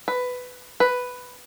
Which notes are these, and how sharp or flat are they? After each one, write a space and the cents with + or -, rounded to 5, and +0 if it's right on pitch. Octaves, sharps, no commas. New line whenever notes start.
B4 +10
B4 +5